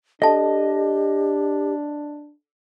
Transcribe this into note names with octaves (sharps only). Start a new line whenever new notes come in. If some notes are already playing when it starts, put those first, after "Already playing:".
D4 G4 A4 D#5 A5